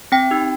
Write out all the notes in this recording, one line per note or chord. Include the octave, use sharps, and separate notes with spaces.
C4 G5
D#4 G4